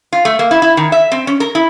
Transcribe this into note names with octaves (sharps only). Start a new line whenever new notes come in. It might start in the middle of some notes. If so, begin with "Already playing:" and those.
F4
A3
A#3
E4
E4
D#3
E5
C4
C#4
A#4
E4